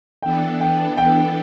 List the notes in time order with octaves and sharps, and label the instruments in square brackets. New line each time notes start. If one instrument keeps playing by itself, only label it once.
[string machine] E3 B3 D4 A4 [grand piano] G5
[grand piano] G5
G5